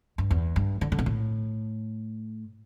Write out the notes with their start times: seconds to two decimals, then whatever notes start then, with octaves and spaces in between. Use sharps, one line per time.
0.18 G2
0.31 E2
0.56 G2
0.81 D3
0.92 D3
0.99 B2
1.06 A2